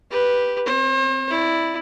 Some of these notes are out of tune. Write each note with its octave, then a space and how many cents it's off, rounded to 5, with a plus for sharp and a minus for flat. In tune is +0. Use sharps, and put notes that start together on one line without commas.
G4 +0 B4 -5
C4 +0 C5 +40
E4 +0 D5 +0